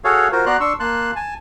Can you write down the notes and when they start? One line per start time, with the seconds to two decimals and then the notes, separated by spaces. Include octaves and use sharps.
0.04 F#4 G#4 A4 C#5 F5
0.32 F4 F#4 A#4 C5
0.46 B3 F#4 D5 A#5 C6 F#6
0.60 D4 C6 C#6 E6
0.80 A#3 A5 C6 F#6
1.16 G#5 A5